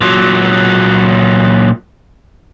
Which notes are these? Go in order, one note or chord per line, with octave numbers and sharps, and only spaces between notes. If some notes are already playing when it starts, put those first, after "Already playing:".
A#2 F#3